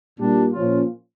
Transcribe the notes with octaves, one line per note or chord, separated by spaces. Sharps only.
A#2 G3 D4
A#2 F3 C#4 F4